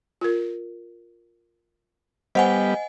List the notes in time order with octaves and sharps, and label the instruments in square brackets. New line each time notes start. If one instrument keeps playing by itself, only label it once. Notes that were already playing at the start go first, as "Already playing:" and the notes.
[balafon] F4 A#4
[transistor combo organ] G3 B3 [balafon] C5 [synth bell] D#5 F#5 G#5